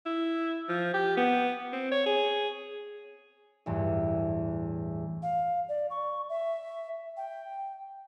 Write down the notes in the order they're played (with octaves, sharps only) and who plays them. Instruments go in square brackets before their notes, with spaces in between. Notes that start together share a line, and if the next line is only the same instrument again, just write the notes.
[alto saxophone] E4
F3
G4
B3
C4
C#5
G#4
[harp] A1 E2 G2
[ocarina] F5
D5
C#6
E5
G5